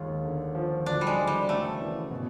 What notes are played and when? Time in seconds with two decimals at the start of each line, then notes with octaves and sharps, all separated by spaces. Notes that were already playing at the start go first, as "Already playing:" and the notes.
Already playing: D#2 G#3 F4
0.24 D3
0.55 F3
0.86 D2 D4
1.01 G3
1.07 G#3
1.17 D2
1.27 G3
1.48 C#3 A3
1.80 E3
2.11 B2